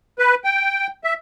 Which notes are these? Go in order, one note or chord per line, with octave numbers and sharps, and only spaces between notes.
B4
G5
E5